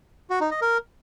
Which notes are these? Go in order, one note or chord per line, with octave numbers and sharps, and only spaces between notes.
F#4
D#4
D#5
A#4